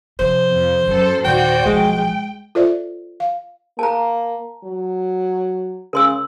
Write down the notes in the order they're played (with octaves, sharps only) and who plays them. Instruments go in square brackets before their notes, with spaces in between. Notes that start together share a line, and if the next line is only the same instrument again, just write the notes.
[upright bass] C3 F3 [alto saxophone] C5
[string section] F2
[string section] F#2 A4 [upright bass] F#3
[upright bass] D#2 A#2 [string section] F#4 C5 D5 [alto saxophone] G5
[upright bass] B1 F3 [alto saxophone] G#3 [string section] G5
[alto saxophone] G#3
[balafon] F4 A4 C5 D5 E5
F5
[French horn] A#3 [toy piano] A5 A#5
[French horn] F#3
[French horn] C#3 [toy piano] A#4 C6 E6